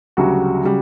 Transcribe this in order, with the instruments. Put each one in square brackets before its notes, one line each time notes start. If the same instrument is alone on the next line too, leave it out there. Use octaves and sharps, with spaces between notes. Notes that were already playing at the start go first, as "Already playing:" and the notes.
[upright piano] D2 C#3 F#3 G3 F#4
C#3 G3